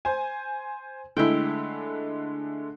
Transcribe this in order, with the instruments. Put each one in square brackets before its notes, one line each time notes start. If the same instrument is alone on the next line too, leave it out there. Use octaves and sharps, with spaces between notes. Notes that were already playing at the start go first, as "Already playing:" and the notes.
[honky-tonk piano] C5 G#5
[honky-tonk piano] D3 G#3 A3 [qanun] E4 G5